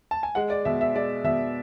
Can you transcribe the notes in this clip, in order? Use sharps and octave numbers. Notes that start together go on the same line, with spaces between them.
A5
G#5
G#3 F#5
D5
B2 E5
E5
G#3 D5
B2 E5